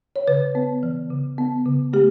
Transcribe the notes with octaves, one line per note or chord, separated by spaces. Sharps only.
C#5
C#3 B4
B3
E3
C#3
B3
C#3
A3 G4